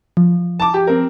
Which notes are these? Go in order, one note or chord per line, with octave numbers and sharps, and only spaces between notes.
F3
A5 D6
G4
C4 A#4